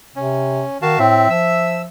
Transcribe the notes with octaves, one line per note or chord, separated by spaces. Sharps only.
C3 C#4
D#3 F#4 F5 A5
A2 C4 E5
F3 E6